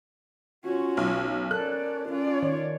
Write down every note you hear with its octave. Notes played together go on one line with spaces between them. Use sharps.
C#4 F4 F#4
B1
C#4 A4 A#4 D5 F#6
C#4 F4 D5
D#3 C#5